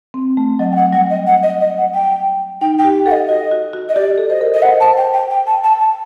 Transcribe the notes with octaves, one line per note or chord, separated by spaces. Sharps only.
C4
A3
F#3 D#5
G5
F#5
G3 F#5
D#5
F#5
D#5
D#5
F#5
G5
D#4 G5
G5
G4
A4 F#5
D#5
F#4 D#5
F#4
F#4
D#5
G4 D5
A4
C5 D#5
A#4
D#5
C5 F#5
C5 A5
G5
G5
G5
A5
A5
A5